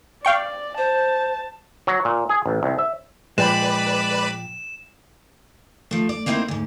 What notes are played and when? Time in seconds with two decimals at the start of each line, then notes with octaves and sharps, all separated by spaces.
0.25 D5 F5 G5 C#6
0.78 C5 A5
1.87 F#3
2.05 A#2
2.29 G#4
2.46 A1
2.63 C2
2.79 E5
3.38 A#2 F3 G#3 B4 D5 G5 B5 E7
5.91 F3 A3
6.09 D5
6.26 A#3 C4 D#4 E4 A4 C5
6.48 D2 G#2